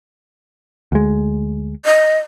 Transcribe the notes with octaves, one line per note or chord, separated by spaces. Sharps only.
D2 G#3
D#5